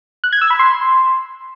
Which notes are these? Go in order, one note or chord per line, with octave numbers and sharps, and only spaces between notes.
F#6
G#6
E6
B5
C6